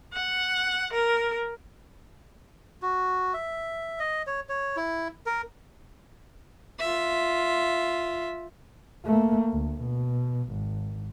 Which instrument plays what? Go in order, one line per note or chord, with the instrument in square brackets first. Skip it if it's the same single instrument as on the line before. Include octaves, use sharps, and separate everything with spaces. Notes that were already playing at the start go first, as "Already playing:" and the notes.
[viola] F#5
A#4
[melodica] F#4
E5
D#5
C#5
C#5
E4
A#4
[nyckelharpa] F4 E5
[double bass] A3 A#3
D2
B2
G#1